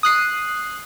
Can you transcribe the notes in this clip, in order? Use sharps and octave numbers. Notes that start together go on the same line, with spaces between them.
D#6 F#6 C7